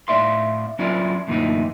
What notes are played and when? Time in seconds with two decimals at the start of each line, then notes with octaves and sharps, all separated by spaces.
0.08 A2 D5 E5 F5 C6
0.79 F#3 C#4 E4 F4 D5
1.28 F#2 A#2 D3 E3 A3 D#4